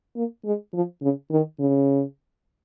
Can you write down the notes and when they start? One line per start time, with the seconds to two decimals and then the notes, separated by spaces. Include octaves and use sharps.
0.16 A#3
0.45 G#3
0.74 F3
1.02 C#3
1.31 D#3
1.60 C#3